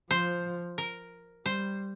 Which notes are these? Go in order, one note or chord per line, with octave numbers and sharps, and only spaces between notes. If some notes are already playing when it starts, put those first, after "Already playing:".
F3 C5
A#4
G3 C5